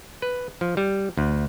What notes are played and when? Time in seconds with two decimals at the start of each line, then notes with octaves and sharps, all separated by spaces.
0.22 B4
0.61 F3
0.77 G3
1.17 D2